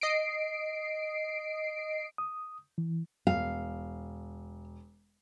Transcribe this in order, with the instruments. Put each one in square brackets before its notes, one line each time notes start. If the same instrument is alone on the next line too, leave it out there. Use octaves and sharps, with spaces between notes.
[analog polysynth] D#5 C7 D7
[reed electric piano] D#6
E3
[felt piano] E1 [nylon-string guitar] F5